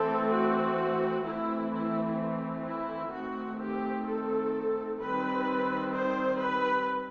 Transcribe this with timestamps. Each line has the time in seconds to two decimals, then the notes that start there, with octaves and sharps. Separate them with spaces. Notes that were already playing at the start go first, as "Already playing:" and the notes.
Already playing: E3 A3 C4 A4
0.32 F#4
1.26 E3 A3 C4 E4
1.73 E4
2.67 E4
3.13 D#3 A3 C4 F#4
3.61 G4
4.07 A4
5.01 D#3 G3 C4 B4
5.94 C5
6.41 B4